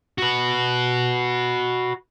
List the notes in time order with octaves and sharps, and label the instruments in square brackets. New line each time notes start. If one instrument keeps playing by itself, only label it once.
[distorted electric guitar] F#4 B4